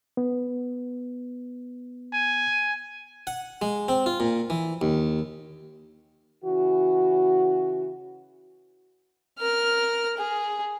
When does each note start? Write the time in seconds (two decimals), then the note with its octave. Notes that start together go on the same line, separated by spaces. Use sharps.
0.17 B3
2.14 G#5
3.27 F#5
3.62 G#3
3.88 C4
4.06 F4
4.20 A#2
4.50 E3
4.81 D#2
6.45 C#3 E3 F#4
9.39 A#4 F6
10.17 G#4